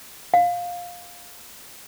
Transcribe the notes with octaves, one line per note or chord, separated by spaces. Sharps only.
F5